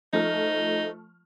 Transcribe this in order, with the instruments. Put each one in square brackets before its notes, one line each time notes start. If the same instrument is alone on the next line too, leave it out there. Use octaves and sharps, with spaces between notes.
[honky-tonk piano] F3 A3 F6 [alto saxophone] D#4